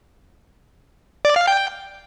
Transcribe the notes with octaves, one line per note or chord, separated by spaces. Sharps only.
D5
F5
G5